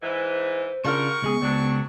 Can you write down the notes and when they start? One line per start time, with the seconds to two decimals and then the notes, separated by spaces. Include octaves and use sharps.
0.02 G#2 E3 C5
0.85 C#3 G3 D4 F4 F#4 A#4 C#6
1.22 C#2 G#3 B3 G#4
1.42 C#2 F#3 C4 D4